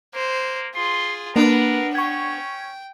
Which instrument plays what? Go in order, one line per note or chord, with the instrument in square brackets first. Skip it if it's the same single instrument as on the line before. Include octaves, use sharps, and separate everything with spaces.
[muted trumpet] A#3 [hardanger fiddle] C5
[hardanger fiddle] F4 G#4 [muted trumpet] C6
[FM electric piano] A#3 [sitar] B3 D4 [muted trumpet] A#4 [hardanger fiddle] B4
[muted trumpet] C#4 [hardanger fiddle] G5 [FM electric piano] C#6 G#6